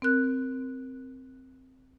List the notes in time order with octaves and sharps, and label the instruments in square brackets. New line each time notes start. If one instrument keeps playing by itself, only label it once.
[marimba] C4 A#4 F#6